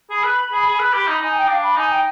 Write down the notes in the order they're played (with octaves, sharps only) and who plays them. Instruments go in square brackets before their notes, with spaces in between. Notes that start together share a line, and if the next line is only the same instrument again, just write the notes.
[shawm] G#4 [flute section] B5
[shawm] B4
G#4
G#4
B4
G4
[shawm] D#4 [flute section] B5
[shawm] D#4 [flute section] G#5
[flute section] G5
[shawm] D4 [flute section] F5
[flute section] B5
[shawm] D#4 [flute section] G#5
[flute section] G5